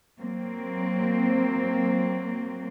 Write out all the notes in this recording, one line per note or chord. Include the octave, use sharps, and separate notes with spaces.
F#3 A#3 C4